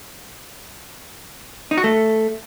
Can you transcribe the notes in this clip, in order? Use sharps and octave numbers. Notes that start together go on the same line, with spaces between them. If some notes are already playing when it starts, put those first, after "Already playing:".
D#4
F#4
A3